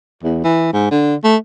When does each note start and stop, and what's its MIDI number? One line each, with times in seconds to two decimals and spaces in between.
0.23 0.42 40
0.44 0.72 52
0.73 0.91 44
0.91 1.15 50
1.24 1.36 57